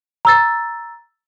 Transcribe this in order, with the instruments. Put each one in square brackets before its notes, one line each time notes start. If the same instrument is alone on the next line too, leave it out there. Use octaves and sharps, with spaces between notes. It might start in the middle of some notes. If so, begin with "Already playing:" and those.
[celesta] A#5 E6 A6